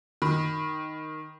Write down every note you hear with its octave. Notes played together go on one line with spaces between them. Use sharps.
D#3 B5